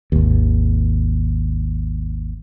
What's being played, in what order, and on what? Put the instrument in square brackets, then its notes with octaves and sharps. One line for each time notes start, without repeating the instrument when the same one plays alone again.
[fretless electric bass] G#1 D#2